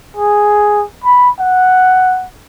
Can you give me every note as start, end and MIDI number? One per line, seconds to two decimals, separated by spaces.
0.16 0.83 68
1.04 1.29 83
1.39 2.25 78